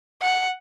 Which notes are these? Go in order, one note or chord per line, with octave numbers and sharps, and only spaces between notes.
F#5